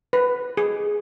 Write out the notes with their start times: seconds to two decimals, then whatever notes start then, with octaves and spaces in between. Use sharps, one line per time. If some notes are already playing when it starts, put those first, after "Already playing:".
0.13 B4
0.57 G#4